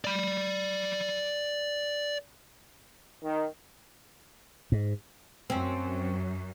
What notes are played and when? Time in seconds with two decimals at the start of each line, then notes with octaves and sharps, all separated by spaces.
0.05 D5 B5
3.23 D#3
4.72 G#2
5.50 F#2 C4 C#4